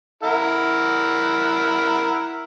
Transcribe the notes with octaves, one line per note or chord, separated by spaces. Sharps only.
E4 A#4 F#5